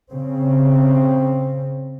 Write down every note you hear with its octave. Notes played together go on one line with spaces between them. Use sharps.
C#3 C4